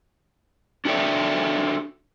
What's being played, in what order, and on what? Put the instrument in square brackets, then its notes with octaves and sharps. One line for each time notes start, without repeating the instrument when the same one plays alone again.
[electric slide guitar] D4 F#4 G4 A4 D5 E5